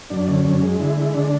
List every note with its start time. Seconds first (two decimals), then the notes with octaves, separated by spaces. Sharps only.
0.10 F#2 D4
0.28 D3 C#4
0.45 F#2 C#4
0.62 G#3
0.79 D3 E4
0.97 G#3
1.14 D3 D4